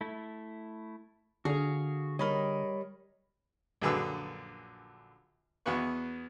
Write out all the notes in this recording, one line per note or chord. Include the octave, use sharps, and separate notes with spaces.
A3 E4
D3 F#4 G#4 F5
G3 A#4 C#5 D#5 B5
A#1 F#2 D3 G#4 B4 E6
E2 B3 F#4 B4 C#6